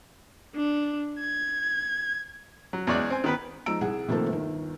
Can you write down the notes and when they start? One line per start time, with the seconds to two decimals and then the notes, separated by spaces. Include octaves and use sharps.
0.56 D4
1.19 G#6
2.73 F#3
2.87 E2 G#3 C#5 D5 F#6
3.10 C4 G#5
3.24 D#3 B3 B4
3.66 F3 G#3 D#4 A#5 E6 D7
3.81 C2 G#4 F#5
4.08 C3 D#3 F3 A3 A#3 A4
4.28 G1 D#2 D#3